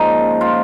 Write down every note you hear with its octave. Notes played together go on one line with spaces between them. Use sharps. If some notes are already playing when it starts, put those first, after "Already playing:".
Already playing: A#2 F3 G#3 C#4 D#4
F4